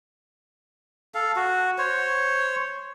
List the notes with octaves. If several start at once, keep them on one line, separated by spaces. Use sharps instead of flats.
A4 F5
F#4
C5 C#5